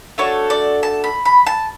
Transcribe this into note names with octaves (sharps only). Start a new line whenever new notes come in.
A3 D4 F#4 A4 C#5
D5
A5
B5
B5
A5